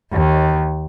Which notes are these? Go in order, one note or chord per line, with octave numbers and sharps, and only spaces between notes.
D#2